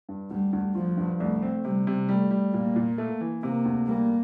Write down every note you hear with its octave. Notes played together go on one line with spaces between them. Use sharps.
G2
D2 G3
D2
F3 F4
G2
C2 A3
C4
C3 G3
C3
G3 A3
G3
A#2 A#3
A#2
A3
E3
C3 A#3
D2
G3 A#3